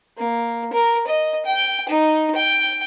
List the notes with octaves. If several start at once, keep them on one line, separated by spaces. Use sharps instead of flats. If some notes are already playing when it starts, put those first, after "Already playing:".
A#3
A#4
D#5
G5
D#4
G5